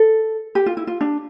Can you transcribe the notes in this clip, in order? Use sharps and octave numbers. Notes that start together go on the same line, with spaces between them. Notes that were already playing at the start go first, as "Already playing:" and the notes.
Already playing: A4
G4
F4
E4
F4
D4